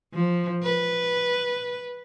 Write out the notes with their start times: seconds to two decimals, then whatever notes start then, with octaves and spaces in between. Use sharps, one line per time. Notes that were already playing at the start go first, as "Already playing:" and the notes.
0.14 F3
0.63 B4